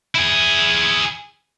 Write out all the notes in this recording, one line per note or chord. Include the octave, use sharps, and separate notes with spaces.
E4 G#4